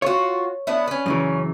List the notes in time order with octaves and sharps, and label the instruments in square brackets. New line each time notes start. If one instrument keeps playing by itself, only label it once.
[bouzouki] F4 F#4 [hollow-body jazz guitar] C#5
[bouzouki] B3 D4 E4
C#4 B4
[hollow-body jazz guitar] F#2 C#3 E3